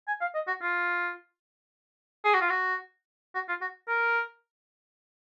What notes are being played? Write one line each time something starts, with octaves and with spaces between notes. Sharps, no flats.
G#5
F5
D#5
F#4
F4
G#4
F#4
F4
F#4
F#4
F4
F#4
A#4